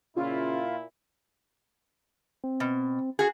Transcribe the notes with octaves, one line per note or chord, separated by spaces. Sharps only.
A#2 C#3 E4 F4
C4
B2
F#4 G#4